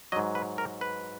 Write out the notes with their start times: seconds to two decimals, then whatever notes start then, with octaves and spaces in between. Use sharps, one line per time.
0.12 G#2 F#3 D#5
0.35 B4
0.58 A#4
0.81 B4